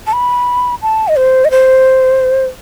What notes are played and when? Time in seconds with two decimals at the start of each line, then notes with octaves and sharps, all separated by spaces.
0.07 A5
0.13 B5
0.82 A5
1.08 D#5
1.16 C5
1.45 D#5
1.51 C5